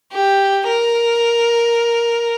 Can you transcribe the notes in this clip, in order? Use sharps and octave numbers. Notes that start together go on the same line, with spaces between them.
G4
A#4